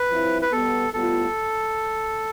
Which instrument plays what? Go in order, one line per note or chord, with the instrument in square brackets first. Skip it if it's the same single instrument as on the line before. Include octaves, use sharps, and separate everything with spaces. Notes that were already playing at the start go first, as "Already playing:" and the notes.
Already playing: [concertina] B4
[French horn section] G2 F3 C4 E4
[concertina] B4
[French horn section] B2 G3 B3 [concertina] A4
[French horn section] A2 G3 B3 F4 [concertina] A4